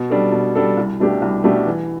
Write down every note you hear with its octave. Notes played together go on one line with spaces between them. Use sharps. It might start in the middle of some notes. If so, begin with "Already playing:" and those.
Already playing: B2
G3 D4 A4
B2
G3 D4 A4
C2
B2 A3 D4 G4
C2
B2 A3 D4 G4
E3